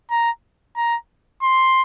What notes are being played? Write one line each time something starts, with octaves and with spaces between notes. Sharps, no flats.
A#5
A#5
C6